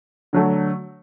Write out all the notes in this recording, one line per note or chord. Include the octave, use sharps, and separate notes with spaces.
D3 F#3 A3